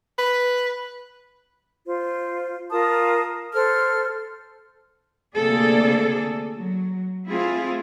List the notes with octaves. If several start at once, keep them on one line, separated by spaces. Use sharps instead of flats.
B4
F4 C5
F4 A#4 A5 D#6
A4 C5 F6
D2 C3 A#3 G#4 A4 D5
F#3
A3 C4 E4 F4 G#4